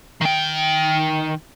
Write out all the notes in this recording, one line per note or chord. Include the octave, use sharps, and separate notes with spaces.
D#3 G5